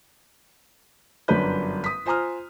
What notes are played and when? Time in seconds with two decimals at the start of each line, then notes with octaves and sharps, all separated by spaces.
1.28 G1 F#2 C#4 D4 B4 G6
1.84 D#6 B6
2.06 F4 C5 G#5 A#5 D#6 F6